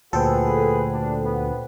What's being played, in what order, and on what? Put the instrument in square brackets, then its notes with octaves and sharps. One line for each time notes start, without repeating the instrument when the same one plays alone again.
[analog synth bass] D2 [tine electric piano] A#2 C5 G5 [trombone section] F#4 G#4 B4 [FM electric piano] A4
[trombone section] D4
B3